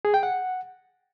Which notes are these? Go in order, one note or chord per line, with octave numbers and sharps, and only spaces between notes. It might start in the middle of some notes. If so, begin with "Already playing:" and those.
G#4
G5
F#5